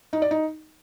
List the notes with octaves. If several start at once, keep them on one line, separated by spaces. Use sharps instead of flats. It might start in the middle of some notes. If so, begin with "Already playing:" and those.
D#4
D5
D#4